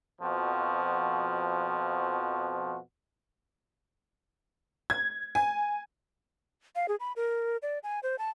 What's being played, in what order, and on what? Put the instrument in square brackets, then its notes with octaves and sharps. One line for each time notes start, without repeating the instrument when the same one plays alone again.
[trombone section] F2 B2 F3 F#4
[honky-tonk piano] G#6
G#5
[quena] F5
G#4
B5
A#4
D5
G#5
C5
A5